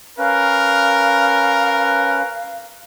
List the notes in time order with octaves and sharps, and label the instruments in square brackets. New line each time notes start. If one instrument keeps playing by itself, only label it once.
[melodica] C#4 B4 [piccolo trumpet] A#4 [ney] F5